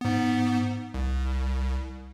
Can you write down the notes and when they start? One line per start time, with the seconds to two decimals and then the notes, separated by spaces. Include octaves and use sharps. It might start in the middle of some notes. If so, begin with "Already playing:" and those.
0.01 G#2 B3
0.94 C2